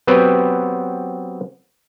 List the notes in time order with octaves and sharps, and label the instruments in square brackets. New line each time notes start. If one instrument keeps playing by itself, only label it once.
[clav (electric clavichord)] F#3 B3 C4 G4 B4 C5